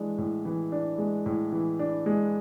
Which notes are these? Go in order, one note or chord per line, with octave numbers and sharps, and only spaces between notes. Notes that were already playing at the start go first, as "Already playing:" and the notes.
Already playing: E3 G#3 D4
A2
E3
D4
G#3
A2
E3
D4
G#3